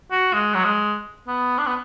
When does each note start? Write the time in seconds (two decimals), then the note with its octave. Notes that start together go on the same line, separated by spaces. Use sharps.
0.12 F#4
0.33 G#3
0.54 F#3
0.65 G#3
1.27 B3
1.58 D4
1.66 B3